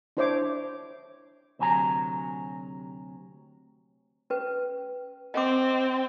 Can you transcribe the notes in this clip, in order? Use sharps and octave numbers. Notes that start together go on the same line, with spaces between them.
D4 E4 C5 C#5 E5 D6
D2 C3 F#3 G#5 A#5
C#4 B4
C4 D#5 D6